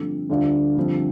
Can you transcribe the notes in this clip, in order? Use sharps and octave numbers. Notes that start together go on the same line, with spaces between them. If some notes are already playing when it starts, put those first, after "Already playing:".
Already playing: G2 D3 F3 A3 C4
D2 D3 G3 D4 F4
G2 D3 F3 C4